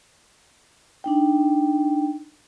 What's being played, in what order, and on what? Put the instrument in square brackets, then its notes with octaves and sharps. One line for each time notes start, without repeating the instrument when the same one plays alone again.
[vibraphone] D4 D#4 G5